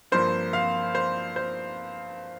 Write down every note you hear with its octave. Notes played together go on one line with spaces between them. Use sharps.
G2 F3 A#3 C5
F5
C5
C5